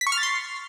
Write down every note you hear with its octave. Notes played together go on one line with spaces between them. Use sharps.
B6
C#6
F6
A6
C6